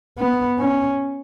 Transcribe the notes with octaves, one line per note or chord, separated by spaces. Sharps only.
B3
C#4